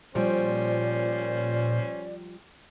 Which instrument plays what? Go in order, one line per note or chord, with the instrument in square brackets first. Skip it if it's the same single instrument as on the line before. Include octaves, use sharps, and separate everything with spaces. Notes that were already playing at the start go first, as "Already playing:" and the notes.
[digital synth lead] A#2 [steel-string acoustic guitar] F3 G3 [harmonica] C#4 C5 [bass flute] D5